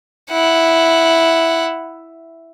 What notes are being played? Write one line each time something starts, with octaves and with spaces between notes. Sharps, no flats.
E4 F#5